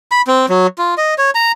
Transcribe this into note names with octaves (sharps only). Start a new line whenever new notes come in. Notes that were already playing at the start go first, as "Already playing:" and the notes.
B5
C4
F#3
F4
D#5
C#5
A#5